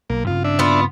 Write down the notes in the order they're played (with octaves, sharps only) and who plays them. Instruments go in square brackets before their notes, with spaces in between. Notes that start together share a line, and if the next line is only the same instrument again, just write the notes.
[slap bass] B1 [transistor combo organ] A#3
[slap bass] G2 C#3 C4 [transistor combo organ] F4
[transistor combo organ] D4 E5
[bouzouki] B3 F4